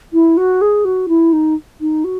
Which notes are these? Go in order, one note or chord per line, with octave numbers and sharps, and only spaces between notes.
E4
F#4
G#4
F#4
E4
D#4
D#4
F#4